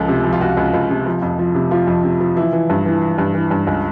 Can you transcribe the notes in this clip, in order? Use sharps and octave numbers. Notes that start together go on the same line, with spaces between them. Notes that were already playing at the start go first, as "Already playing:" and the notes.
Already playing: C#2 F3 A4
C3
F3
F4
C#2 F#4
C#2
C#2
C3
F3
F2
F3
C3
F3 F4
F2
C3
F3
E3 E4
E3
G2
E3
E3
G2
E3
G2
C#2